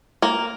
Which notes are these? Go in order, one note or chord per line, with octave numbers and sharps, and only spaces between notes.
A#3